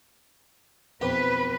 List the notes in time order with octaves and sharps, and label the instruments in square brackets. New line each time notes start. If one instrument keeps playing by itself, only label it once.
[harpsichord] B1 F2 G4 [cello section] B4